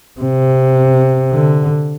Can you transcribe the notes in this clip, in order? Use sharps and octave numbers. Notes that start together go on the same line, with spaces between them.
C3
D3